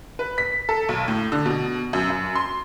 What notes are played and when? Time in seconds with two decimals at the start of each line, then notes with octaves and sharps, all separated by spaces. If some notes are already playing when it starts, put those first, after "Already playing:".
0.19 B4
0.38 B6
0.69 A4
0.89 B1
1.08 A2
1.32 D3
1.46 B2
1.93 F#2
2.10 F#2
2.35 C6